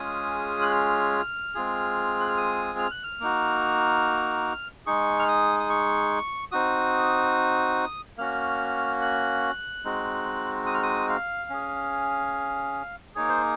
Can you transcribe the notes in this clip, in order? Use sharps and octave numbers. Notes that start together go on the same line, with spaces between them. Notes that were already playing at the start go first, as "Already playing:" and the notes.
Already playing: G#3 C#4 F4 G#4 D#6
F#6
F6
G#3 C4 F4 G#4
F#6
F6
D#6
F6
F#6
F6
A#3 D#4 F#4
G#3 D#4 G#4 C#6
F6
D#6
D#6
C#6
C4 D#4 F#4 D#6
A#3 C#4 F#4 F6
F#6
G#3 C4 D#4 F#4
D#6
F6
D#6
F5
C#4 G#4
A#3 D#4 G#4 C#5
C5